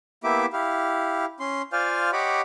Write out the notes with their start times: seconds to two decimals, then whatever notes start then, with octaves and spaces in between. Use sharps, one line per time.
0.24 A#3 B3 E4 G4 E5 D6
0.53 E4 G4 F5
1.40 C#4 C6
1.73 F4 C5 D5 F5 G#5 F6
2.13 G4 C#5 D#5 F#5 B5 D6